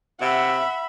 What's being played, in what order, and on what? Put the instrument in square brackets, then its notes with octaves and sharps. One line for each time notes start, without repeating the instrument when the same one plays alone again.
[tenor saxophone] C3 [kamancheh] E5 B5 [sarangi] F#5